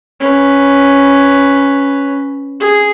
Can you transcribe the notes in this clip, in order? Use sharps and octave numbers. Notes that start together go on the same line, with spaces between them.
C#4 B4
G#4